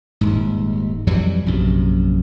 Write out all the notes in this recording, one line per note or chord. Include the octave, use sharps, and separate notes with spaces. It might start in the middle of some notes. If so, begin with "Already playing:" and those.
D#1 G#2
F2 E3 F#3 G3
A#1 F#2 C3